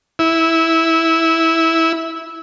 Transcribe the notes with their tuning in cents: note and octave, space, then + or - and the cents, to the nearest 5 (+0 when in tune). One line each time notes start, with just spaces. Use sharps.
E4 -10